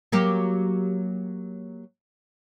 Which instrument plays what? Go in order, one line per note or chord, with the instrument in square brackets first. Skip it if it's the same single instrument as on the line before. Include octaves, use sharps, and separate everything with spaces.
[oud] F#3 A#3 G4